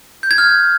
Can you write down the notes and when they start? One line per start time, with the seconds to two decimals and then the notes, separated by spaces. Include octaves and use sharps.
0.23 G6
0.31 G#6
0.38 F6